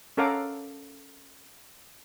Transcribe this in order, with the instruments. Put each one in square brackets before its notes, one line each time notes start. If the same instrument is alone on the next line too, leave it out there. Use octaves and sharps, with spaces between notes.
[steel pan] C#4 A4 A#4 F5 F#5 D6